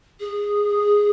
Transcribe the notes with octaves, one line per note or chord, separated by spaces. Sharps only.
G#4